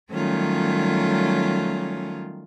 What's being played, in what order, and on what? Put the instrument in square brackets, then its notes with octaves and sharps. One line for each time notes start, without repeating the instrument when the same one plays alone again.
[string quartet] D#3 F#3 G3 A3 C#4 F4